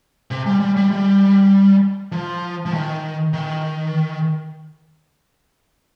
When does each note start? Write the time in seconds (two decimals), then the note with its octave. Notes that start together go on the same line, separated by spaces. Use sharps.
0.31 C3
0.46 G3
0.60 G3
0.76 G3
0.91 G3
2.12 F3
2.66 F3
2.73 D#3
3.33 D#3